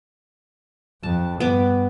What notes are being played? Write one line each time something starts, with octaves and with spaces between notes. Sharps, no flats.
F2 A5
G2 B3 D6